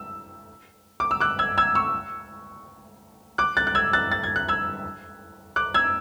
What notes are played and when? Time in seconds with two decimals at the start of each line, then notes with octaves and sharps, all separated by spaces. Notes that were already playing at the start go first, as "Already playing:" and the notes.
Already playing: E6
1.00 D6
1.11 E6
1.20 D6 F#6
1.39 E6 G#6
1.58 E6 G#6
1.75 C#6 E6
3.38 D6 F#6
3.57 F#6 A6
3.67 F#6
3.75 E6 G#6
3.93 F#6 A6
4.12 A6
4.23 G#6
4.36 F#6
4.48 E6 G#6
5.56 D6 F#6
5.74 E6 G#6